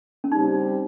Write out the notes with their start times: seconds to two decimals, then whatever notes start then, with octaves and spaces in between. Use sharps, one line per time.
0.24 C#4
0.32 C#3 G3 C4 D#4 G4
0.53 D#4